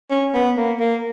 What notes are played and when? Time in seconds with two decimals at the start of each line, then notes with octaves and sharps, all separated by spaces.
0.10 C#4
0.34 B3
0.57 A#3
0.80 A#3